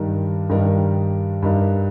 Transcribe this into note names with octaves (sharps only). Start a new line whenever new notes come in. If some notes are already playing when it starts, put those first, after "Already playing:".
Already playing: G2 D#3 G3 D#4 A#4
G2 D#3 G3 D#4 A#4
G2 G3 D#4 A#4